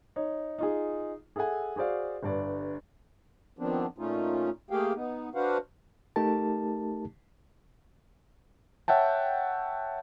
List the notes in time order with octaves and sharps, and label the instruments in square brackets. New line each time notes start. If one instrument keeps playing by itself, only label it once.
[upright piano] D#4 C#5
D#4 F4 G#4
G#4 A4 E5 F#5 G#5
F#4 G#4 C5 D5 F5
G1 G2 D5
[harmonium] D#3 F3 B3 C4 D4
A#2 A3 C#4 D#4 F4
A3 A#3 G4 G#4 F5 G5
B3 D#4
D4 F#4 B4 C5 F5 F#5
[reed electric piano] A3 D#4 G4 A#4 A5
[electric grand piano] C#5 E5 F#5 G5 A5